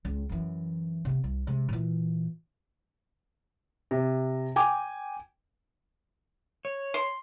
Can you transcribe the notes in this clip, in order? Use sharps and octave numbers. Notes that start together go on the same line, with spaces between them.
C#2
F#2 E3
C3 B3
C2
C3 G#3
A#2 E3
C3
G5 G#5 D6
C#5
C6